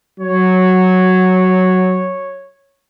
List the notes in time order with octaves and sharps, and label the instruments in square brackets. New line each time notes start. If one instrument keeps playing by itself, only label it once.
[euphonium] F#3 [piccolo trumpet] C#5